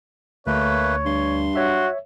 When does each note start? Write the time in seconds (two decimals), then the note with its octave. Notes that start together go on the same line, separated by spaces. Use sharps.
0.47 D2 A3 A#3 B4 C#5
1.06 G2 C6
1.56 F#4 C#5 E5